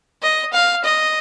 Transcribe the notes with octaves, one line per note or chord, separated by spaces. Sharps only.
D#5
F5
D#5